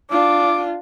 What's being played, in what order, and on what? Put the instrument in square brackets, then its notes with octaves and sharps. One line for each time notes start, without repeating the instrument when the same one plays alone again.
[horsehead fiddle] D4 F4 [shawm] D6